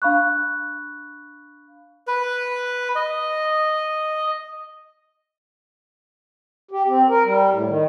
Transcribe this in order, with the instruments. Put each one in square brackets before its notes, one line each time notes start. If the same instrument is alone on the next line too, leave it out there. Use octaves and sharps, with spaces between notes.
[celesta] D4 F5 B5 C#6 F#6
[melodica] B4
D#5
[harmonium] G4
C4
A#4
G3
A2
D#3